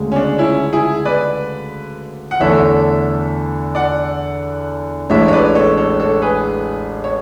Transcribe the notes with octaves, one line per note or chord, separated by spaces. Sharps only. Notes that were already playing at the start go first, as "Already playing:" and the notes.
Already playing: D2 C#3 G#3
C#4
D4
C#4 E4
E4 G#4
B4 D5
F#5
E2 D3 A3 D4 A4 C#5 E5
D5 F#5
A1 A2 G#3 D4 C#5 E5
C#5
B4 D5
A4 C#5
A4 C#5
A4 C#5
G#4 B4
C#5